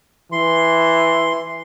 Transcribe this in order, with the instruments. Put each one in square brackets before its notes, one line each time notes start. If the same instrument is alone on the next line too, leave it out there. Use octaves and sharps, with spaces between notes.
[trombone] E3 [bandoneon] C6